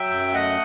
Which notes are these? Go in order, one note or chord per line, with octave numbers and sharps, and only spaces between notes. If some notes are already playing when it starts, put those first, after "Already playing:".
Already playing: F#3 E5 G5
F#2
A3 D#5 F#5